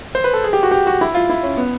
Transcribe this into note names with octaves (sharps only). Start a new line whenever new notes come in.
C5
B4
A4
G#4
G4
F#4
G4
F#4
E4
F4
E4
C#4
B3